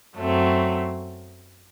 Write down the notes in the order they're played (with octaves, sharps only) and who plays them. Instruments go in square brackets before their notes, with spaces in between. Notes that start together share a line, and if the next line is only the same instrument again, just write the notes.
[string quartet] F#2 F#3 A3 C4